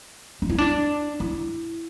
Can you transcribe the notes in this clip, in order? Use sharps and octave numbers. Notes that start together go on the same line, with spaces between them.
D4
E4
D4
E4